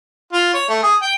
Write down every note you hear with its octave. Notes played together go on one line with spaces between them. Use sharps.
F4
C#5
A3
G#4
G5